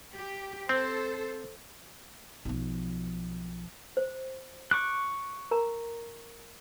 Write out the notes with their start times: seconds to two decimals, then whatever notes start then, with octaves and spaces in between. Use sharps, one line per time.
0.14 G4
0.69 C4 A4 C5
2.45 B1 F3
3.97 C5
4.71 C#6 D6 F#6
5.51 A#4 A#5